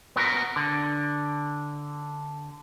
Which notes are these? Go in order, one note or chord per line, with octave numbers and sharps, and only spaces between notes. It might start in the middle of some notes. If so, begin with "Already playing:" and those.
B3 F#4 A#4
D3